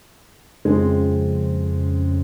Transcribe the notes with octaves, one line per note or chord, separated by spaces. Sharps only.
F2 C#3 G#3 C4